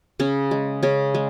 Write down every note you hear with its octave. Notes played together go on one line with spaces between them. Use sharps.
C#3 C#4
G#3
C#3 C#4
G#3